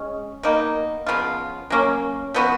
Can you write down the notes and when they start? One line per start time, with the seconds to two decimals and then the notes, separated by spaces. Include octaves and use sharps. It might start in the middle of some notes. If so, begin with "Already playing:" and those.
Already playing: G#3 C#4
0.43 B2 A#3 D#4
1.06 C#3 F3 B3 F4
1.70 F#3 A#3 C#4
2.34 F3 B3 F#4